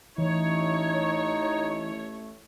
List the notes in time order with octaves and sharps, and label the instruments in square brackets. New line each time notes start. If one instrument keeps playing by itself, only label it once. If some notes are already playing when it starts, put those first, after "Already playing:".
[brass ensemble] A1 A3 [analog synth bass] E3 [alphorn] D#4 [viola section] C#5